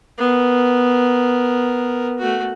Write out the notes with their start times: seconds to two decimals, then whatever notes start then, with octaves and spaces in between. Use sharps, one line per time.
0.18 B3 A#4
2.18 A3 F#4